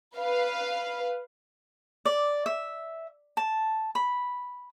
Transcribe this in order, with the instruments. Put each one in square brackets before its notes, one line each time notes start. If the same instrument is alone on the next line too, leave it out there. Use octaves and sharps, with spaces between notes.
[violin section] B4 F5
[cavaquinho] D5
E5
A5
B5